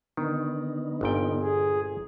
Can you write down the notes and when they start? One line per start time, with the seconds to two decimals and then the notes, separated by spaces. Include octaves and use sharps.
0.17 D3 D#3 B3 D#4
1.01 G1 A#2 G5
1.42 G#4